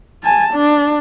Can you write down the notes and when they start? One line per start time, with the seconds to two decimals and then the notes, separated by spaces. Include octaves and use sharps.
0.23 G#5 A5
0.54 D4